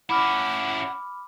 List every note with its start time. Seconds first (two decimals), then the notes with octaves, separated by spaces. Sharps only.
0.10 C#4 E4 F#5 B5 D6 F6